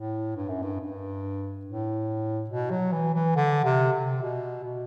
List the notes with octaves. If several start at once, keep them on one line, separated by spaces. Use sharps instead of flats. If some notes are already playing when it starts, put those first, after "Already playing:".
Already playing: A2
G2
F#2
G2
G2
A2
B2
F#3
E3
E3
D3
C3
C3
B2
B2